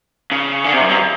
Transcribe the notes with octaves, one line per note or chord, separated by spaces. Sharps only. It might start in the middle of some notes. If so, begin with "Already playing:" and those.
C#3
D3
C3
F#2
G2